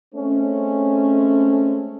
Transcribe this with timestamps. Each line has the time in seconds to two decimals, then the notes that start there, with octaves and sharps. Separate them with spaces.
0.14 G#3 A3 C4 C#4